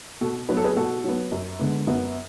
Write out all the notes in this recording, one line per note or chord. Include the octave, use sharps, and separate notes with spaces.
B2 F#4 A4
F#3 B3 B4
A4
G#4 B4
B2 F#4 A4
F#3 B3
F#2
D3 G#3 B3
F#2 B3